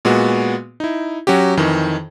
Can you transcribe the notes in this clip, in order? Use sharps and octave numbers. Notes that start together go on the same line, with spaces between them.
A#2 G#3 B3 F#4
D#4 E4
F#3 C#4 F#4 G4
F2 D#3 E3